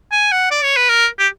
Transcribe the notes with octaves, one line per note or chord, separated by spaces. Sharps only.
G#5
F#5
D5
C#5
B4
A#4
G4